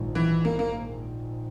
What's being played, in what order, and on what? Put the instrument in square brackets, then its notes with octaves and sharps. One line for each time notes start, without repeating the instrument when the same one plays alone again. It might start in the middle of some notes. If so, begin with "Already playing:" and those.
Already playing: [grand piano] A#1 G#2 D#3
[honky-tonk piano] E3
A#3
A#3